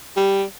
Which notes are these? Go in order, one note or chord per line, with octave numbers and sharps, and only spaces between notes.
G3